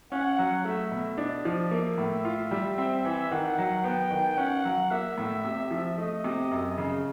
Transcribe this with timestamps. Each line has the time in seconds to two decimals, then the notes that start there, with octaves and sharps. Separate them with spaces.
0.12 C#4 F#5
0.39 F#3
0.65 A3 E5
0.92 B2
1.18 D4 D#5
1.45 F3
1.71 A#3 E5
1.98 A2
2.25 F4
2.51 G3
2.78 C4
3.05 E3
3.31 D#3 F#5
3.58 F#3
3.84 B3 G5
4.11 D#3
4.38 C#4 F#5
4.65 F#3
4.91 A#3 E5
5.18 A2
5.45 C3
5.71 F3
5.98 A3 D#5
6.24 C3
6.51 F#2
6.78 C#3